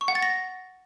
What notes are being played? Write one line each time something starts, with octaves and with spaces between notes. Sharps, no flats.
C#6
F#5
A6
A#6